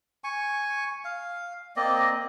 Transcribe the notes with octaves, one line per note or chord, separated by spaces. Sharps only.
G#5 C#6
F5
A#3 C4 D5 D#5